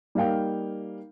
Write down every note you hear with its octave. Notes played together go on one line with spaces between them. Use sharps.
G3 A#3 D#4 F5 G5